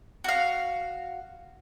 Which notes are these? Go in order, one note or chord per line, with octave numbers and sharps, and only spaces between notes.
F#4 F5